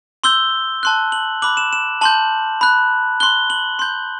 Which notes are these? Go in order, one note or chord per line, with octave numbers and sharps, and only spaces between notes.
C6 E6 G6 G7
A5 C6 F#6
F#7
B5 D6 F#6 F#7
E7
E7
A5 C6 G6 F#7
B5 F#6
C6 F#6 G7
F#7
C6 G6